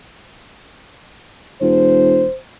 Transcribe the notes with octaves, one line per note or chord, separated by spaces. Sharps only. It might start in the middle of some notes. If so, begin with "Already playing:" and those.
E1 C5